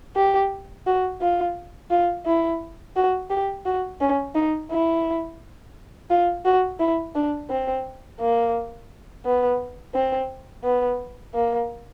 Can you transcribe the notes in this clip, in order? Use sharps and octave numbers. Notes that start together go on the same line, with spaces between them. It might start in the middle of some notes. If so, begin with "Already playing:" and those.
G4
F#4
F4
F4
E4
F#4
G4
F#4
C#4
D#4
E4
F4
F#4
E4
D4
C4
A#3
B3
C4
B3
A#3